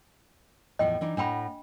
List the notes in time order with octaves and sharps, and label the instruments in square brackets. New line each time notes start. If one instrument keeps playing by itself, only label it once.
[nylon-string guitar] E2 A2 F3 [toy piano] D#5 G5
[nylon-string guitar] E3 D4 D#4
[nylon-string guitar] A2 D#5 F#5 [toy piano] D4 G5 B5